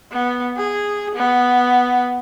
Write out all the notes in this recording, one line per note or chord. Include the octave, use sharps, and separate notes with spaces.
B3
G#4
B3